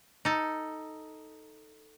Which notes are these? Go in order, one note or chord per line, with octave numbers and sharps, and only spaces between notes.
D#4 A4